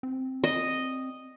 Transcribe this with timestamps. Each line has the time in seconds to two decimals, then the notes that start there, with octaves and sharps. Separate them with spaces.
0.03 C4
0.44 D#5